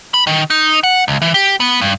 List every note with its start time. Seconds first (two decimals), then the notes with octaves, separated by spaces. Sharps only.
0.14 B5
0.27 D#3
0.50 D#4
0.84 F#5
1.08 C#2
1.22 E3
1.34 G4
1.60 B3
1.81 G2